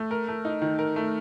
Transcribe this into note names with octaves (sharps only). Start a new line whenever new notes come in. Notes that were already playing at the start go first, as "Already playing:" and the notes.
Already playing: A3
A#4
A3
D#4
D#3
A#4
A3